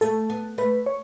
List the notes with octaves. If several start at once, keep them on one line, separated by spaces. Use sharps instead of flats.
A3 A4
B3
A3 B4
C#5